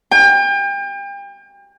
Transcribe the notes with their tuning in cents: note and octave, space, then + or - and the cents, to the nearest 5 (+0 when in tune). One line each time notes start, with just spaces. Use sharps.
G5 +35